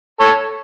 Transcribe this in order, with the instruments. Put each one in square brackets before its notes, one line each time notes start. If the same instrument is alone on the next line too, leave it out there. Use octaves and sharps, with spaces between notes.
[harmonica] A4 C#5